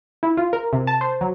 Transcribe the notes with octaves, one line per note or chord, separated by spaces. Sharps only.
E4
F4
A#4
C3
A5
C5
F#3